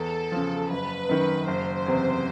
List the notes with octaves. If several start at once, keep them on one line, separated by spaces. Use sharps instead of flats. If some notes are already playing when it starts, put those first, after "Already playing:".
Already playing: E2 A4
C#3 F3
F#1 B4
F#2 D#3
F#1 C5
E2 C3